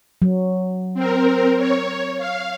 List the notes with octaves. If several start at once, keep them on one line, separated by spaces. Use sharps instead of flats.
F#3
C4 A#4
C#5
F5